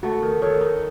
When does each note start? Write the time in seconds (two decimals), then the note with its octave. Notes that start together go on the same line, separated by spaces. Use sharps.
0.03 A3 F#4
0.22 D#3
0.42 D#3 A4 C#5
0.61 D#4